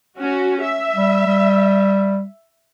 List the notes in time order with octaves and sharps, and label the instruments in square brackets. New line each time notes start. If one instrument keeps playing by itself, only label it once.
[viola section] C#4 F#4
E5
[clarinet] G3
G3